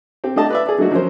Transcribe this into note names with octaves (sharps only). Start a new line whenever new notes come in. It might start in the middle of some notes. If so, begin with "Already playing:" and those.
C4 G4
A3 D4 G4 D#5 A5
B4 D5 E5
G#4 D5
F#3 A3 A#3 D4 D#4 F#4
F3 F#3 C#4 A#4 C5